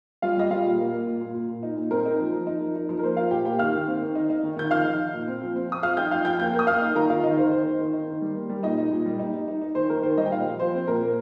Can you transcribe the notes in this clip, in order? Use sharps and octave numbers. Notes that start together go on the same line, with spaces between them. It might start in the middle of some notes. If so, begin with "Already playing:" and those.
G3 F4 F5
G3 D#5
G3 F4 F5
A#2
A#3
A#3
A#2
A#2
A#2
A#2
D#4
A#2
C4 A#4
D#4
F3
F3
D#4
F3
D#4
F3
A#4
A#3 C5
A#3 F4 F5
A#2 G4 G5
A#3 G4 G5
D#3 F5 F6
D#3
C4
D#3
D#4
D#4
D#3
D#3 G6
F3 F5 F6
D#4
D#4
A#2
C4
F3
C4
C4 D#6
F3 F5 F6
D#4 G5 G6
F3 F5 F6
F3 G5 G6
A#3 G5 G6
A#3
D#6
A#3 F5 F6
D#4
D#3 A#4 A#5
D#3 F4 F5
D#3 D#4 D#5
D#3 C5
D#4 C5
D#3
D#3
D#4
D#3
G3
A#3
G3
A#2 D#4 D#5
D#4
A#2
G3
D#4
D#4
D#4
D#4
D#3 C5
D#3 A#4
D#3 C5
G3 D#4 D#5
G5
A#2 F4 F5
F3
F3 C5
C4
A#2 A#4
A#3